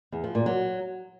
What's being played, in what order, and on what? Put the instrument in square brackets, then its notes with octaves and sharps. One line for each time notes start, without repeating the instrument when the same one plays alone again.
[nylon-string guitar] E2
F3
A#2
F#3